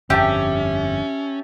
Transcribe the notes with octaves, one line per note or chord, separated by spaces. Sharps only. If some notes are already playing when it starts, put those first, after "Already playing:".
G1 F2 C#4 G4 E5 G5 A5